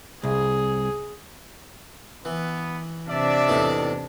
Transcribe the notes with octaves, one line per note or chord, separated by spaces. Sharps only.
C2 G#4
E3 B3
C3 D4 D5 E5
E2 A2 D#4